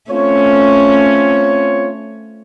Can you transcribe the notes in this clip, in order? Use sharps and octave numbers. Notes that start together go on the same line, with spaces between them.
A3 C4 C#4 F4 C#5